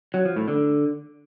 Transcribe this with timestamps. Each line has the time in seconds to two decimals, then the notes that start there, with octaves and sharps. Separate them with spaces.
0.14 F#3
0.25 F3
0.36 A2
0.48 D3